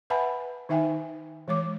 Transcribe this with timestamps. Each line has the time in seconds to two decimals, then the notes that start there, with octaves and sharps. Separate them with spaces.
0.10 B4 E5 F#5 G#5 A5 B5
0.69 D#3 D#4 E5 G5 G#5
1.48 E3 G#3 C#5 D6